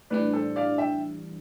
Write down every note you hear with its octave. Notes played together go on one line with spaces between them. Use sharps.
A2 E3 G3 D4 B4 D5
A4 C5
D5 F5
E5 G5